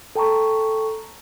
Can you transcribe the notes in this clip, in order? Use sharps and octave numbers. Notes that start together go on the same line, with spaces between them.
A4 G5 A5 A#5 C#6